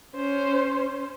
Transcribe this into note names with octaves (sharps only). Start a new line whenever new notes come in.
C#4 C5